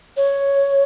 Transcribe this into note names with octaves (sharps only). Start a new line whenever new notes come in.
C#5